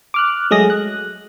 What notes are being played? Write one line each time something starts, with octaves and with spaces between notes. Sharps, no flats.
D6 F6 F#6
F#3 G#3 A3 G#4 D#6 A#6
F#6